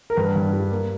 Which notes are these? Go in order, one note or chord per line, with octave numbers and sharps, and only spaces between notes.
A#4
G2 B4
G2
G3
A#3